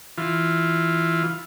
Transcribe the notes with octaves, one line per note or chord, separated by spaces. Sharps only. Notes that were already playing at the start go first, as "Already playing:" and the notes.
E3 F4